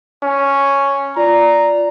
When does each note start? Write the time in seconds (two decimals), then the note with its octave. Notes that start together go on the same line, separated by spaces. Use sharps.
0.23 C#4
1.16 F4 D5 A#5